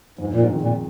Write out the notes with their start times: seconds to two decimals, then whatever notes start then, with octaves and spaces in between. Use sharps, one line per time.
0.18 F2 G#2
0.32 A#2
0.40 G#2
0.51 D#3 G#3 C4
0.61 A#2